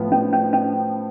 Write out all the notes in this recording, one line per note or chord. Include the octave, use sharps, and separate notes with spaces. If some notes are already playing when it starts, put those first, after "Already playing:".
Already playing: A2 F3 B3
C#4
C#4
C#4